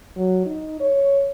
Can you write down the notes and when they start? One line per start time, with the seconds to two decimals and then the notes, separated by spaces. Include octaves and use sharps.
0.16 F#3
0.46 D#4
0.80 C#5